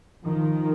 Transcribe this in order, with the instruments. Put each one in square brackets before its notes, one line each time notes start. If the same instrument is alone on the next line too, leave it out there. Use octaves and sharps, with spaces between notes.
[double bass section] D#3 F3